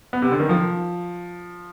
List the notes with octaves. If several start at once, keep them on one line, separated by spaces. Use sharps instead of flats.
B3
C3
D3
D#3
F3